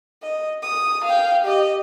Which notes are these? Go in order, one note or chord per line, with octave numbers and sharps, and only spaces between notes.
D#5
D#6
F5 G5
G4 D#5